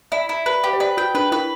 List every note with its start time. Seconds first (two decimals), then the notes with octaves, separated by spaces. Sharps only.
0.12 E4 D5
0.29 E4
0.46 B4
0.64 G4
0.73 C5
0.80 B4 D5
0.97 F#4 G5
1.15 D4 B4
1.32 E4 B4